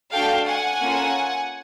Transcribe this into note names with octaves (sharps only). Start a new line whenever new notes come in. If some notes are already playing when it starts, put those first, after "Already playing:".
A3 D4 F#4 A4 F5 G5
F#5 G#5
A#3 C#4 F4 A4